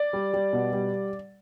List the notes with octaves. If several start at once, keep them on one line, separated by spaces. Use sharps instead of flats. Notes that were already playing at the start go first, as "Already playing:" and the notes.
Already playing: D5
G3
G3
B2
G3